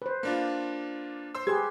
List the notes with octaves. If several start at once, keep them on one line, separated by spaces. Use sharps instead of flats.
B4 C5
A#3 D4 F4
C5 C6 E6
G4 G#4 B4 C6 G#6